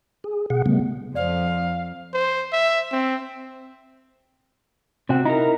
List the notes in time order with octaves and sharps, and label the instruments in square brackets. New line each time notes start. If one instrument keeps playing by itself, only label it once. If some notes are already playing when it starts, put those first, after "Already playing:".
[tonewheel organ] G#4
B2 G#4 F#5
C#3 G3 A3 B3
[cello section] F2 [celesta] C5 D5 [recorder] F5
[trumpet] C5
E5
C4
[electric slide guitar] C3 F#4 [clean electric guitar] C4
[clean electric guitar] D#4 [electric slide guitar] E4 A#4